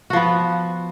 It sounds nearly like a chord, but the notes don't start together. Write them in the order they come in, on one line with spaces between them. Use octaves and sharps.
F#4 F3 B3